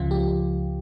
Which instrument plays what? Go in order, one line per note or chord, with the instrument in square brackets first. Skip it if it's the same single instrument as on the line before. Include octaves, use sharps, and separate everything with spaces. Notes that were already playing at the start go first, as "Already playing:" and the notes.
Already playing: [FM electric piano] C#2 C#3 F3 F4
G4